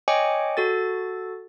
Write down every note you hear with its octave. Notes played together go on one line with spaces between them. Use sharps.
C#5 D#5 G5 G#5 D6 C#7
F#4 A4 A6